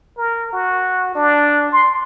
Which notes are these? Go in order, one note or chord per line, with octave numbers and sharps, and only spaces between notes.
A#4
F#4
D4
C6